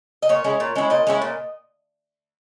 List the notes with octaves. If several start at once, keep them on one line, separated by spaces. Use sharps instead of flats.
D#5
A#2 C#5
G#3 C#4 E4
A#2
G#3 C#4 E4
A#2 D#5
G#3 C#4 E4
A#2